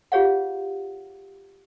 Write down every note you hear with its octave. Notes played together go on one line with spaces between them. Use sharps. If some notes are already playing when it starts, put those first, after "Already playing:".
F4 G4 G#4 C#5 F5 F#5